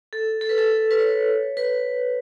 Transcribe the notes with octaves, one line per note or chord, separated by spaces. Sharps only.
A4
A4
B4
A4
B4
C#5
B4